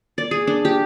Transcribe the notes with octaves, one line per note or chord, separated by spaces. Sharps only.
D5
G#4
D4
G4